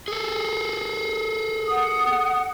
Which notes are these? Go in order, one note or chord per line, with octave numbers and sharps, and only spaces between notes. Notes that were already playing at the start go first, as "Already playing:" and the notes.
G#4 A4
F#5 D#6